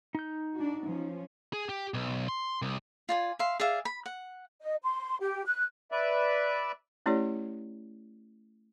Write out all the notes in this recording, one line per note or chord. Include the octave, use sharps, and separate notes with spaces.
D#4 G6
D4 F#4
F3 C#4
G#4
G4
B1
C6
C2
F4 D5 G#5
E5 F5 C6
G#4 D5 E5 F5
B5
F#5
D#5
C6
G4
F#6
B4 D5 E5
A3 C#4 E4 G4 C#5 D5